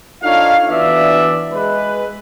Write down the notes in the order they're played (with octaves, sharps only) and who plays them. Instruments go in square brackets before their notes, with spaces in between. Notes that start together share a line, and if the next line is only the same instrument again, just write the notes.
[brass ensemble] D4 D#4 F4 A4 C#5 F5
E3 B3 D4 F#4 D5 E5
G#3 B4